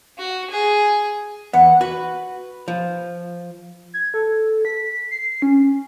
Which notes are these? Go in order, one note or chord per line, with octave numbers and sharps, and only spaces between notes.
F#4
G#4
E2 B3 F#5
F#4 B4
F3
G#6
A4
B6
C7
C#4